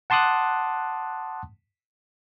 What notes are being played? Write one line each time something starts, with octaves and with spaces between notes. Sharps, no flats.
F#5 A5 C6 D6 D#6 F#6